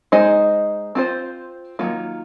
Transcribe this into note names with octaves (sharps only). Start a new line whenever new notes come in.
G#3 D#4 G#4 C5 D#5
C4 F4 C5
D#3 F#3 A#3 F4